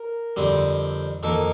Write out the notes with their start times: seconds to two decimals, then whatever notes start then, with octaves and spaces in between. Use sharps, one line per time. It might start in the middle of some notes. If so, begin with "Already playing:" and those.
Already playing: A#4
0.36 F2 D3 G3 C4
1.23 F2 D#3 A#3 A4